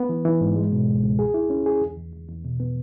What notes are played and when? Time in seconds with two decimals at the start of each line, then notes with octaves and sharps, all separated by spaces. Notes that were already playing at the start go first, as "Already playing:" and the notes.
Already playing: B3
0.09 E3
0.25 E3
0.40 G#2
0.56 G#3
0.72 B2
0.87 C#2
1.03 C#2
1.19 G#4
1.34 E4
1.50 C#4
1.66 G#4
1.81 E2
1.97 E2
2.13 E2
2.29 E2
2.44 B2
2.60 B3